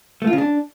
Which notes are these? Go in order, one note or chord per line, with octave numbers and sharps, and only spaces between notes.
A3
F4
C#3
D4